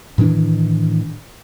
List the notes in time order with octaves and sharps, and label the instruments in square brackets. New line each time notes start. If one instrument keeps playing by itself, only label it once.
[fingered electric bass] A2 D#3 E3 D4